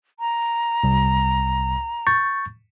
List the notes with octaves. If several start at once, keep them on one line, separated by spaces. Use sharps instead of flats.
A#5
C2
C#6 G6 A6